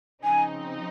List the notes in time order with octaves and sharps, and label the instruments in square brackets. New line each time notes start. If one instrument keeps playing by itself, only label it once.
[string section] C#3 F3 C4 D#4 [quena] G#5